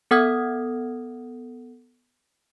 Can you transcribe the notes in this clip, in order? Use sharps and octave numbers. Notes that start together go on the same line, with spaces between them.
B3 A4 F#5 D#6 F6 G#6